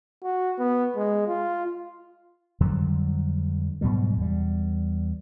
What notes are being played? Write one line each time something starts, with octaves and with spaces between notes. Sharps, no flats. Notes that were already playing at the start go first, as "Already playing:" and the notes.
F#4
B3
G#3
F4
F2 D3 F#3 G3
G#2 B2 F#3 G3
E2 G3